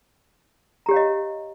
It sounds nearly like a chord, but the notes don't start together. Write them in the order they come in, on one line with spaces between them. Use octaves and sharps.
A#5 G4 C#5 F5 D#5